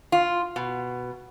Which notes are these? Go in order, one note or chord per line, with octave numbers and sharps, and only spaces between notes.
F4
B2